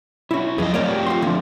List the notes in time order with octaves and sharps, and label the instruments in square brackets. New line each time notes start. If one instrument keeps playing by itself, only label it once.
[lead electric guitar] B1 F#4 [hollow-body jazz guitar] C#4 E4
[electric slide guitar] E2 D#5 [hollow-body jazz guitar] F3 G#4 [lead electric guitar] F#3 B4
[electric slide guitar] A3 C4 [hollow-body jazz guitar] A#4 C#5 D5
[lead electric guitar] F#4 G4
[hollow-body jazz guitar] F4 C6
[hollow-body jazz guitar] D3 E3 A#3 [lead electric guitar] F3